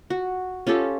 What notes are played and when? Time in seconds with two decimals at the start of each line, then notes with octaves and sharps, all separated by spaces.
0.10 F#4
0.67 C#4 F4 G4 A4